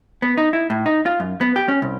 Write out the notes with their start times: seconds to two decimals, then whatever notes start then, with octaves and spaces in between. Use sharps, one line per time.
0.22 B3
0.37 D#4
0.53 E4
0.70 A2
0.86 D#4
1.06 F4
1.20 F#2
1.41 B3
1.56 G4
1.68 C#4
1.82 C2